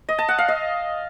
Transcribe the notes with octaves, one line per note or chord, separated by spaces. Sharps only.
D#5
A5
F#5
F5
D#5